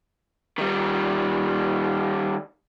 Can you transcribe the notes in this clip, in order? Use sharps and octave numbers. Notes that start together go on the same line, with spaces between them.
D#3 G3